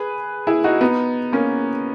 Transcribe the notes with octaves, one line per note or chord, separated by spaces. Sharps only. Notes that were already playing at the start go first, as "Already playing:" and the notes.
Already playing: G#4 B4
E4 G#4
D#4 F#4
B3 D#4
A#3 C#4